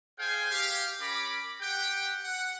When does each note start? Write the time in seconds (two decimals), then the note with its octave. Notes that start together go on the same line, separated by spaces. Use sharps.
0.19 G#4 C5 F5 G5 G#5
0.51 G4 F5
1.00 C#4 A#4 B5 D6
1.61 G4 F#5 G5
2.23 F#5